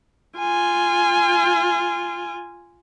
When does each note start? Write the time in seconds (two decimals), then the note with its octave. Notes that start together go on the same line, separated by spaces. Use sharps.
0.38 F4 G#5